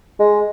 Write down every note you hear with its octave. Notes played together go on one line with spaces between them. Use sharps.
G#3